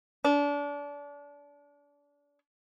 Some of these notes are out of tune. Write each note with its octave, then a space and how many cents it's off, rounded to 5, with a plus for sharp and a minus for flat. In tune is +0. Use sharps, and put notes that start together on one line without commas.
D4 -30